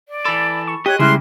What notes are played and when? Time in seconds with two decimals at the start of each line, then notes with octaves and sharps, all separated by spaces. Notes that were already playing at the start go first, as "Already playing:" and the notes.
0.08 D5
0.25 E3 A4 B5
0.67 C#6
0.86 G4 C#5 D#5 F#6
0.99 C#3 G3 G#3 E4 G#4 C6 F6 F#6